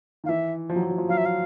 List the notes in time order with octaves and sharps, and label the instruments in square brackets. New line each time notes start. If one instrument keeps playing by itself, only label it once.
[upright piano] D#3 [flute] F5
[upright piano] E3 [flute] E5
[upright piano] F3
F#3
F3
F#3
F3
[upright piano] F#3 [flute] F5
[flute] E5
F5